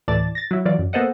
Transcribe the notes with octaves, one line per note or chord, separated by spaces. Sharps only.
D2 A2 E3 D5 A5 A6
A6 A#6
F#3 E4
E3 F#3 F4 D5
F#2
A#3 B3 A4 C5 D#5 F#5